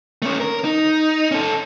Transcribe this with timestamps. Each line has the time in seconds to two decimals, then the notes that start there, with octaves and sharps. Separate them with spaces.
0.22 A3 C#4
0.40 A#4
0.64 D#4
1.31 C#4 A4